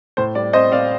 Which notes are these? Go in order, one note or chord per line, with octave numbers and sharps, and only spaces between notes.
A2 C5
G3 D5
C4 C5 D#5
C4 D5 F5